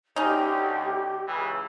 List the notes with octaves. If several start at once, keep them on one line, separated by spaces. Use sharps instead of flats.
D2 C#4 D#4 G4
C#2 C#3 E3